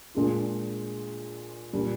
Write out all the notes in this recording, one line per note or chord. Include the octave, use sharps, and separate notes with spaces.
A#2 G#3 D4 F4
A#2 G3 D4